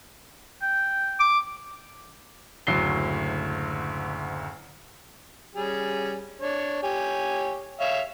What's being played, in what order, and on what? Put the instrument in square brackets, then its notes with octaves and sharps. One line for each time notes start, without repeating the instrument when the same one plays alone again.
[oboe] G5
[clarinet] D6
[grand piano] F#1 D2 A2 F#3 C7 G7
[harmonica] G3 C#4 G#4
D4 C#5
G4 C#5 G#5
C#5 E5 F5